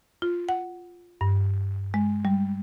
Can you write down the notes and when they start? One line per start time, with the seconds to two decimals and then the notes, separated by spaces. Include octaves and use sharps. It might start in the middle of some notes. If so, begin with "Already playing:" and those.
0.22 F4
0.49 F#5
1.21 G2
1.94 G#3
2.25 G3